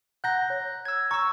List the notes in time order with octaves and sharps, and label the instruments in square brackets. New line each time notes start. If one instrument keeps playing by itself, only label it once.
[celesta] F#5 A#5 [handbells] F#6 G6 A#6
[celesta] C#5
[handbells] E6 G#6
[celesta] A#5 [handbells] C#6 E6